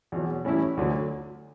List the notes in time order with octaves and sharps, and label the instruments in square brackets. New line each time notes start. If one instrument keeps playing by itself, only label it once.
[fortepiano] E2 B2 F#3
A1 A2 G3 C#4 E4
D2 D3 F#3